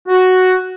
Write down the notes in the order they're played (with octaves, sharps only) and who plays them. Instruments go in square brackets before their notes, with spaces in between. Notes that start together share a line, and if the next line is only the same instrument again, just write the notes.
[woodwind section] F#4